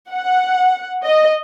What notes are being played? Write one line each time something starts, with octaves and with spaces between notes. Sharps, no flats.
F#5
D#5